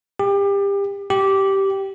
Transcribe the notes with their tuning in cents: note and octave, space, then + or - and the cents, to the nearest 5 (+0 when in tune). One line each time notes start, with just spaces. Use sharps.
G4 +30
G4 -10